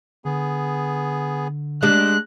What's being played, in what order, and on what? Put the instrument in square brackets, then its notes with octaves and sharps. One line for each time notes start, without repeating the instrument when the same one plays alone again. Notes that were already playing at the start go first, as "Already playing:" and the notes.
[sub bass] D3 [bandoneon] B3 G#4
[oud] G#3 D4 G4 [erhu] F#6